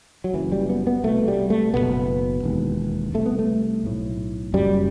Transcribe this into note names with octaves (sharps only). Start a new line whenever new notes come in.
F#3
F#1 F#2 E3
G3
B3
B3
C2 B2 A3
G3
A3
F#1 E2 B2 B3
E1 D#2
C2 C3 A3
B3
A3
B1 A2
F#1 F#2 G3